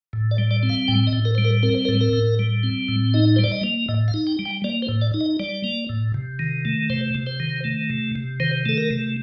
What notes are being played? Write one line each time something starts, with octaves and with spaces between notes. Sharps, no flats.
A2
D5
G3
D5
C4
F5
A2 G5
D#5
A2
A#4
G3 C5
A#4
C4 A#4
C5
A#4
A2
A#4
A2
G3
C4
A2
D#4 D#5
G3 C5
D5
D#5
A#3
A2 D#5
F5
D#4
G5
G3
G5
A#3 D5
C5
A2
D5
D#4
D#5
G3 D5
A#3
A2
C3
D#3
A3
C3 C5
C3
C5
D#3
A3
C3
C3
D#3 C5
A3 A4
A#4
C3